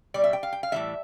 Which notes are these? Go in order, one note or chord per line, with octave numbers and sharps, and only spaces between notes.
B2 G3 D5
E5
G5
F5
G5
F5
A2 E3 G3 E5